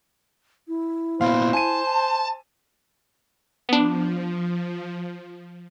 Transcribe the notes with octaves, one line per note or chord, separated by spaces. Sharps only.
E4
A#2 B3 C5 F5
G#5 A5 D#7
F3 B3 D4